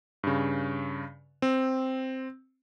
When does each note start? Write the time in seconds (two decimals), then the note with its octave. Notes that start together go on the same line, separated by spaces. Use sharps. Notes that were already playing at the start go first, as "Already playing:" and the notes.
0.23 G2 C#3
1.42 C4